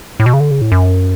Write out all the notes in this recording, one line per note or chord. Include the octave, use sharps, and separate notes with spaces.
A2
B2
C#3
D3
C#3
A2
F#2